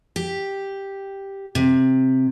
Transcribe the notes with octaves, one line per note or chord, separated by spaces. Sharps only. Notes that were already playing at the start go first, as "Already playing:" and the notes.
G4
C3